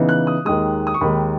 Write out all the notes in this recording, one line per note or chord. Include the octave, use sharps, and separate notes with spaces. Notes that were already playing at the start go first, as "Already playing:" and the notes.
Already playing: C#3 E3 B3 D#4
F#6
D#6
D#2 D#3 G#3 D#6
D#6
C#6
D#2 D#3 G#3 B5